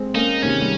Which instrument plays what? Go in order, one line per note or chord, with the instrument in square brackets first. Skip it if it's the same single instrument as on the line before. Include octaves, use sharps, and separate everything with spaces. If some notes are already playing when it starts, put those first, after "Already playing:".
Already playing: [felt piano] G#3 C4
[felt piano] A#3 C#4 [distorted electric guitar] D#4
[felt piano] C3 D#3 [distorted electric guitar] C#4
[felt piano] G3